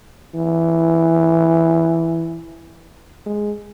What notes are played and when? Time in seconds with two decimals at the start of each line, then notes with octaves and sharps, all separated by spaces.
0.35 E3
3.26 G#3